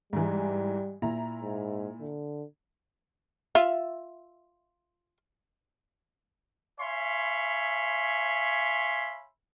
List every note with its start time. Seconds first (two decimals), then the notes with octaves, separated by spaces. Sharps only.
0.13 G#2 E3 G3
1.02 A#2 E4 A#5
1.43 G#2
2.01 D3
3.55 F4 E5
6.79 C#5 E5 F5 G#5 B5 C6